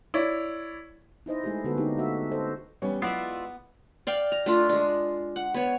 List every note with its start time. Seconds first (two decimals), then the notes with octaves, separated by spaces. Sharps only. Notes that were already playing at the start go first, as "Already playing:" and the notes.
0.14 E4 C#5 D5
1.26 D#4 E4 C5 D#5
1.44 G#3 A3 E4 G4 G#4
1.64 D3 B3 F#4 A4 B4
1.77 A#3 C#4 D#4 G4
1.98 A3 F#4 E5
2.31 A4 C5 D#5
2.82 E3 G3 B3 C#4 C#5
3.02 F#3 G#3 B3 E4 F4 B4 D5 E5
4.07 D5 F5 G5
4.32 A#5
4.46 A3 D4 F4
4.69 G#3 D4
5.36 F#5
5.54 B3 C#5